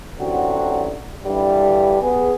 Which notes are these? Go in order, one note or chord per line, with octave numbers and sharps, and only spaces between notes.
A1 D3 F#3 C4 F#4
G2 D3 E3 G3
B3 G#4